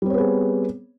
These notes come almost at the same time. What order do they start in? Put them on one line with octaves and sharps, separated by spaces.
G3 C4 C#5 B3 G#4